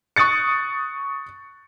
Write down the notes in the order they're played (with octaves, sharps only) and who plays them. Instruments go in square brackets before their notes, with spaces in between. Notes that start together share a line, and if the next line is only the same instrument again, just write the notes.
[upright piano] C#6 D#6 F#6 A6 C#7